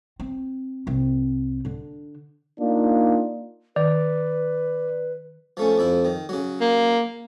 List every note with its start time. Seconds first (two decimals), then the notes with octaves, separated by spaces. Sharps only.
0.20 C4
0.87 C2 C4
1.65 D3 D4
2.60 A#3 D4 D#4 F4
3.76 D#3 B4 D5
5.57 F3 A3 C#4
5.78 F2 F3 E4
6.05 D#3
6.29 C#3 F#3
6.61 A#3